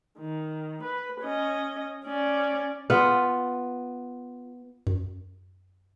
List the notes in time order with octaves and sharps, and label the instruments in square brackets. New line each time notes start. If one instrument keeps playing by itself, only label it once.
[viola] D#3
B4
C#4 D#5
C#4 D5
[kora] B3 F4
[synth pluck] F#2